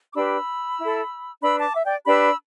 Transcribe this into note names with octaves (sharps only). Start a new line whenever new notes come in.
D6
D4 G4 B4 B5 E6
E4 A4
D4 B4 B5 E6
A5 D6
E5
D5 G5
D4 G4 B4 B5 E6